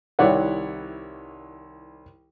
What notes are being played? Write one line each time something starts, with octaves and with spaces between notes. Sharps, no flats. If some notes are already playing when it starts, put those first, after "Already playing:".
C2 D#3 E4 C#5 D5 F#5